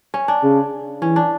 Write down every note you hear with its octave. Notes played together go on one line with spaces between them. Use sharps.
C#4
D4
C#3
E3 C#4
D4